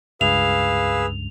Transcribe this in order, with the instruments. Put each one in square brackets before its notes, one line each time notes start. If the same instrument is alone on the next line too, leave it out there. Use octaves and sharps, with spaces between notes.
[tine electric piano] C#2 G2 [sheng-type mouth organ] G#4 B4 E6 [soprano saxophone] F5 [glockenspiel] F7